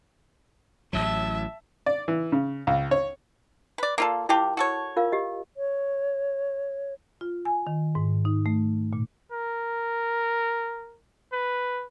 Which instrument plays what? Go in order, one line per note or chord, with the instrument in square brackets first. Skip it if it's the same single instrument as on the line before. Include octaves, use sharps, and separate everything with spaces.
[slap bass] A1 A2 F#3 [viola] E5 A5
[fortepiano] D5
E3
C#3
C#2
C#5
[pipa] B4 D5
[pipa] A#3 F4 A4 [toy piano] A#4 D5
[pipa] G3 F4 G4 [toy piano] E4 A5 D6
[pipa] F#4 A4 C#5
[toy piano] F4 A#4 F5
G4 D#5
[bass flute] C#5
[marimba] F4
G#5
D#3
G#2
D#4
A3
A#2
[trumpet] A#4
B4